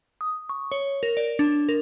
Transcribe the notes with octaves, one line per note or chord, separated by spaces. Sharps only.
D#6
C#6
C#5
A#4
D5
D4
A#4